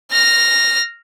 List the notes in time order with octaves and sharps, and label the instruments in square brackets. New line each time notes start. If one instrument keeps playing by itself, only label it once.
[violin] F6 A#6